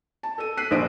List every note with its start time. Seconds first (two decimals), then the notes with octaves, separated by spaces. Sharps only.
0.23 A5
0.38 A4 D#7
0.57 F#6 B6 C7 D#7
0.71 A#1 G2 C5 D#6 D7